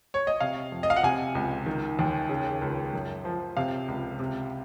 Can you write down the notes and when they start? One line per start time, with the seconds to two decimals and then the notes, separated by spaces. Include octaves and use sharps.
0.14 C#5
0.27 D#5
0.40 C3 F5
0.72 F2
0.83 D#5
0.90 F5
0.96 F#5
1.03 C3 G#5
1.35 C#2
1.66 D#3
1.99 D#2
2.29 C#3
2.62 C#2
2.93 F#2
3.25 F3
3.57 C3 F5
3.88 C#2
4.19 C3